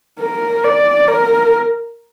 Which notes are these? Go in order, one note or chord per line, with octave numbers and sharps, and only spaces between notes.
A#4
D5
A#4